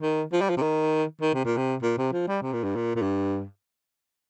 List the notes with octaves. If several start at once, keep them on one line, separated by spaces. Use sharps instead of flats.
D#3
F3
G3
F3
C3
D#3
D#3
C3
A#2
C3
A#2
C3
F3
G3
C3
A#2
G2
A#2
A#2
G2